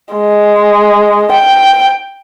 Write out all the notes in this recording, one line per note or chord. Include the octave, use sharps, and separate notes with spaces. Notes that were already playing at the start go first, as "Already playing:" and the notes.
G#3
G5